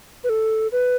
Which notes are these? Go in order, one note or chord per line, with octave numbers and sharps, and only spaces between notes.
B4
A4
B4